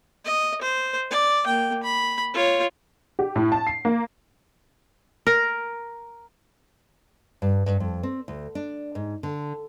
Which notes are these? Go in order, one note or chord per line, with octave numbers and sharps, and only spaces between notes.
D#5
C5
D5
A#3 G5
B5
F4 C#5
G4
A2
A5
C7
A#3
A#4
G2
G2
F2
C4
D2
D4
G#2
D3